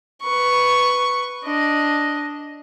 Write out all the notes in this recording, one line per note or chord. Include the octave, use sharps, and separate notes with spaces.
B4 C#6
D4 D#5